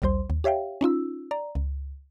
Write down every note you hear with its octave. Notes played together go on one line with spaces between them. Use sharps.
A#1 D#2 G3 C5 C6
D#2
G4 C#5 E5 F5 G5
C#4 D#4 F4 E6
D5 A#5
C#2